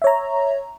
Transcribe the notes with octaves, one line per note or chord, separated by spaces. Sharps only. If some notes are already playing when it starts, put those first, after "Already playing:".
C#5 E5 A#5